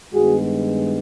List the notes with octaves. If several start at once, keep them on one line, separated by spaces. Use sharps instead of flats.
G2 D#3 G#3 B3 F#4 G#4